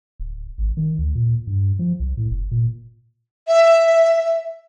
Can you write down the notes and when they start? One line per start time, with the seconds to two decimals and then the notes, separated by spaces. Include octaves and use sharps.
0.19 D1
0.58 G#1
0.77 D#3
0.98 D2
1.15 A#2
1.47 G2
1.79 F3
2.00 C2
2.17 A2
2.30 F1
2.51 A#2
3.47 E5